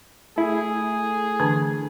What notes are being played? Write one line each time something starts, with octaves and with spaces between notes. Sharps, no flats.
A3 E4 G#4
D3 E3 D4